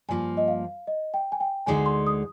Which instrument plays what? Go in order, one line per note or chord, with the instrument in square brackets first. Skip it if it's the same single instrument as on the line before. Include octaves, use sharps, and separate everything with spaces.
[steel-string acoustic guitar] G2 F3 A#3 [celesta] G#5
[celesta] D#5
F5
D#5
G5
G#5
G5
[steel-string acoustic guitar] D2 D3 G#3 D#4 [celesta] G#5
[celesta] C6
D#6